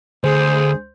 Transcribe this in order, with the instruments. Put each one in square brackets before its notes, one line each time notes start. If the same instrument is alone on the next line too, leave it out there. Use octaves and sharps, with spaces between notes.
[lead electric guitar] D2 [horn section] G#4 [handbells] C5